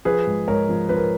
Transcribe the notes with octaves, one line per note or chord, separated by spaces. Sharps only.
F3 G#4 B4
G#2
G#2 A#4 C#5
F3
F3 B4
A#4